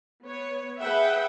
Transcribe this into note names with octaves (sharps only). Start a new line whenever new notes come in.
B3 C#5
G#4 B4 E5 F#5 G5